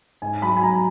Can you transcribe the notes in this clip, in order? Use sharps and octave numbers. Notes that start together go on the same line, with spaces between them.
G#2 G#5
F#3 B5
G#5
F#3 A#5